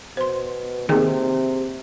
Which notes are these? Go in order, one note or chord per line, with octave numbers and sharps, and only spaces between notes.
B2 C5 C6
C3 D#3 A#3 C4 G#4